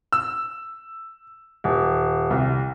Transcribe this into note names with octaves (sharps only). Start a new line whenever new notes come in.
E6
D#1
C2